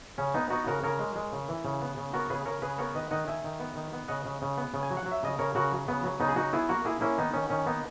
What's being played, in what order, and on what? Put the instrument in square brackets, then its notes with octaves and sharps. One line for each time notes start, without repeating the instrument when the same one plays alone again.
[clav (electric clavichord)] C#3 C#4
B3 D#4
B3 D#4 F#4
C#3 F#4 A#4
C#3 A#4 C#5
G#3
G#3
C#3
E3
C#3
B3
C#3
B3 F#4 A#4
C#3 G#4 B4
C#3 A#4 C#5
C#3 G#4 B4
B3 A#4 C#5
D#3 B4 D#5
D#3 D#5 F#5
D#3 E5 G#5
D#3
B3
D#3
B3
C#3 D#5 F#5
C#3
C#3
B3
C#3
G#5
F#3
F#5
F#3
E5
C#3 D#5
C#3 A#4 C#5
C#3 F#4 A#4
F#3
C#3 B3
F#3
C#3 B3 D#4
G#4
F#3 D#4 F#4
B3 E4 G#4
A#3 F#4 A#4
A#3 E4 G#4
A#3 C#4 E4
D#3 B3 D#4
D#3 C#4
D#3 C#4
A#3 B3 D#4